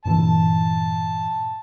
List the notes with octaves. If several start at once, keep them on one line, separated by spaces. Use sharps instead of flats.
G2 A#2 E3 A5